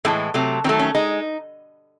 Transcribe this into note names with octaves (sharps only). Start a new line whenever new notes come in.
A2 E3 G#3 A3
C3 F#3 A3
D#3 F#3 A3 C4
C#4
G#3 D#4